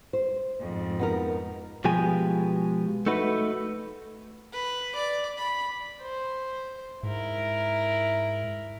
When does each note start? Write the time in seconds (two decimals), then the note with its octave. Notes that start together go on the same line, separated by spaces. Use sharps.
0.13 C5
0.60 F2 G#2
0.99 B3 D#4 A#4
1.85 B2 F3 G#3 G4 G#5
3.06 A3 D#4 F#4 B4
4.53 B4
4.96 D5
5.38 B5
6.02 C5
7.03 G#2 E4 A#4